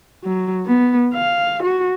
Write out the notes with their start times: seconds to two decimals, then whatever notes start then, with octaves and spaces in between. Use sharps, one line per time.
0.24 F#3
0.66 B3
1.14 F5
1.63 F#4